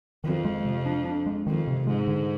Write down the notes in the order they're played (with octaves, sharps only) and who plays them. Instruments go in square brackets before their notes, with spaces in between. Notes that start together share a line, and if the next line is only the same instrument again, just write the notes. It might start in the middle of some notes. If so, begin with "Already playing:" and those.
[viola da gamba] F2 [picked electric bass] D#3
[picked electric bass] G#3
C3
D4
D4
G#3
[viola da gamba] F2 [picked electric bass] D#3
[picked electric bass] C3
[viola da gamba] G#2 [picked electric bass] G#3
[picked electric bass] D3